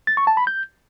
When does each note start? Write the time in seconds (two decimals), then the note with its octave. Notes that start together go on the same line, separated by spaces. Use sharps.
0.07 A6
0.17 C#6
0.27 A5
0.37 B5
0.47 G6